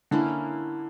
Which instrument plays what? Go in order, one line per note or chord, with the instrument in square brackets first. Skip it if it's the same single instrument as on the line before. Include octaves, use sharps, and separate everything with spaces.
[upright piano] D3 [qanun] A#3 C#4 E4